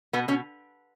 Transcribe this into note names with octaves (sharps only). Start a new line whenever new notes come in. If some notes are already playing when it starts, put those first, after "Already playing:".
B2 B3
B2 C#4